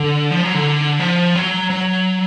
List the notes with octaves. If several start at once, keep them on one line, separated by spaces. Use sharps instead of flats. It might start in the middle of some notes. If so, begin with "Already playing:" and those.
Already playing: D3
F3
F#3
D3
F3
F#3
F#3